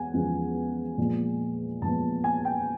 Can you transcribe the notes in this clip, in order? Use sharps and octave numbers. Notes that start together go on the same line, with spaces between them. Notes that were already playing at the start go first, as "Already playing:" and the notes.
Already playing: E2 G#3 B3 F#5 G#5
E2 C#3 F3 G#3 B3
A#2 F3 G#3 B3
A#2 F3 G#3 B3 A5
G#5
G5